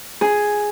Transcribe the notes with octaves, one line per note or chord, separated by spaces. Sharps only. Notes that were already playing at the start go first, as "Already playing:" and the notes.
G#4